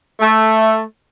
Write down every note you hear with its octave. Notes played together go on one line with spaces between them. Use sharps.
A3